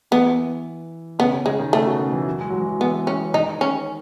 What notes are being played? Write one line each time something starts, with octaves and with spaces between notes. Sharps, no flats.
E3 B3
C#3 B3
C#3
C#3 G#3
D#3
C#3 A3
B2
C#3
E3
F#3
G#3
F#3
G#3
E3
F#3
E3 B3
C#4
D#3 D#4
C#4